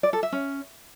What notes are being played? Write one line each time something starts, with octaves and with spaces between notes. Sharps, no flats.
D5
A4
E5
C#4